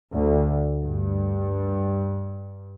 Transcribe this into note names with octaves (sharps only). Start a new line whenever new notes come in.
D2
G2